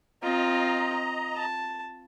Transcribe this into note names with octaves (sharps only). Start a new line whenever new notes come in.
C4 F4 D#5 A#5
A5